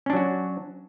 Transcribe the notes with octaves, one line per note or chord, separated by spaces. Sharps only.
F#3 C#4 D4 F#4